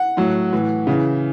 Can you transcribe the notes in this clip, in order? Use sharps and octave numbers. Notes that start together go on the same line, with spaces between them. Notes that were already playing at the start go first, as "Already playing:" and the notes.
Already playing: F#5
A2 F#3
A2 E3
C#3 E3